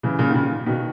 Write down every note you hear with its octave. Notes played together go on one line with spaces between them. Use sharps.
C#3 E3
A#2 C#3
D#3
A#2 C#3
B2 D#3